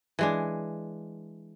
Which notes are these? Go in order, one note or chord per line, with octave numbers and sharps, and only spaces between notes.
E3 G#3 D4